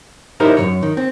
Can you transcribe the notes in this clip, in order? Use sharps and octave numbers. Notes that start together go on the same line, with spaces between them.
D#4 E4 G4 A#4 C5
F#2 C#3 C#5
D#3
C4